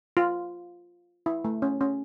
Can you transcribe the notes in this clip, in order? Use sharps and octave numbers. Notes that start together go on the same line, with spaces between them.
F4
E4
A3
C#4
C#4